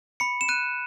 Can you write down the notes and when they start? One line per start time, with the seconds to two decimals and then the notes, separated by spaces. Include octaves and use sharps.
0.20 B5 C#7
0.41 E7
0.48 F#6 D#7